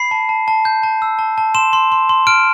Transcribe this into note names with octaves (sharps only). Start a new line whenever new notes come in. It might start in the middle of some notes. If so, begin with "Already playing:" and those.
Already playing: B5 C7
A5
A5
A5
G6
A5
E6
A5
A5
C6 E7
C6
C6
C6
F6 D7